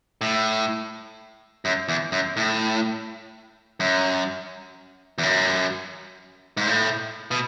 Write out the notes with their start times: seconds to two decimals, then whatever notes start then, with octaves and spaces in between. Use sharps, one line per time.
0.21 A2
1.65 F#2
1.88 E2
2.12 F#2
2.37 A2
3.80 F#2
5.18 E2
5.23 F#2
6.57 G#2
6.67 A2
7.31 B2